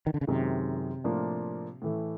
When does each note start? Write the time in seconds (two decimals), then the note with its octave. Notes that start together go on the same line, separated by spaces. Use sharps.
0.07 D#3
0.14 D3
0.21 C#3
0.27 F#2 C3 D#3 G#3
1.04 A2 F3 A#3 D4 F4
1.82 A2 E3 A3